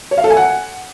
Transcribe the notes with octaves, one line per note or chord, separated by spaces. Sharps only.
C#5
F5
A4
G#5
F#5